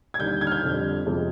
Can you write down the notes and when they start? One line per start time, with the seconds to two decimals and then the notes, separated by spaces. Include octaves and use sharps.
0.14 G#6
0.19 D#2 D3 G3 G6
0.41 G#6
0.47 F6
0.51 G6
0.63 F2 D3 G3
1.06 F2 C3 F3 G#3